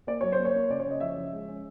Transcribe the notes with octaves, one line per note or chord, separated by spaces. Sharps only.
A#3 D5
F#3 C#5
C5
A#3
C#5
A#3
C#3 D5
C#5
C#3 D#5
F3 E5
F3
G#3
C#4